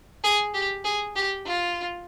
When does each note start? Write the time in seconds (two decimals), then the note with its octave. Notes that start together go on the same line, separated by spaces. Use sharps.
0.24 G#4
0.54 G4
0.85 G#4
1.16 G4
1.46 F4